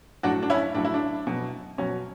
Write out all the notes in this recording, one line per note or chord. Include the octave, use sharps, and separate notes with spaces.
A2 F#3 D4 F#4
D4
C#4 E4
A2 F#3 D4
E4
D4
B2 F#3
B2 F#3 C#4